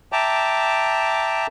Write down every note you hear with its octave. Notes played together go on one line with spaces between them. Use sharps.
E5 G5 A5 A#5 D6